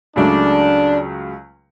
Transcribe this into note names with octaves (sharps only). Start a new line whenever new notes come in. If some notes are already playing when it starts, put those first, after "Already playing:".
C#2 C#3 F#3 A3 D4